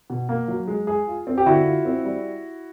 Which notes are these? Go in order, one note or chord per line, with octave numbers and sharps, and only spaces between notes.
B2
A#3
F#3
G#3
G#4
F4
C4
G4
D3 E4 F#4
F4
C4
G3